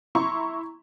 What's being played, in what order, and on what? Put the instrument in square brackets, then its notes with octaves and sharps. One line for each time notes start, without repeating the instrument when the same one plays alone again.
[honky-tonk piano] E4 A#5 C6 C#6